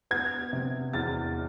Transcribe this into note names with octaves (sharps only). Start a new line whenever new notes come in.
B3 G#6
C3
E2 A6